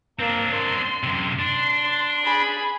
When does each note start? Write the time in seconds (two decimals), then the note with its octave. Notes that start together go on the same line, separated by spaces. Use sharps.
0.19 A#3 C4 D4
0.55 C6
1.03 F#2 C3
1.39 D4 C6
2.23 G#4 B5